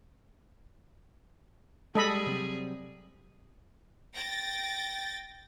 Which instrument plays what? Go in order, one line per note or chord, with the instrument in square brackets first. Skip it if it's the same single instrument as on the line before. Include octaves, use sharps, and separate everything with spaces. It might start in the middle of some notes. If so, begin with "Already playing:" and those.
[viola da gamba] G3 G#4 [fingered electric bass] G#3 [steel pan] A4 D#5 B5
[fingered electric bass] C3 F#3 C4
[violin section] G5 A6 A#6